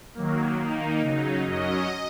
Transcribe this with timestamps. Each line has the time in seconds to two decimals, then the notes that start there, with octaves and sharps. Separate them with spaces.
0.14 D#3 F#3 A#3
0.58 D#3 A#3 D#4
1.01 C#3 F#3 D#4
1.45 F#2 F#3 C#4 D#5